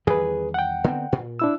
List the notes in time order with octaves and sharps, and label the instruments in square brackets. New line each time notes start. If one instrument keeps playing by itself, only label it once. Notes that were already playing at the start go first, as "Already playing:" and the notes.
[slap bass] E2 D#3 G3 [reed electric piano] G#4 B4
[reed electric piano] F#5 G5
[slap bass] D3 B3 C4
A#2
[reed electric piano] D4 E4 E6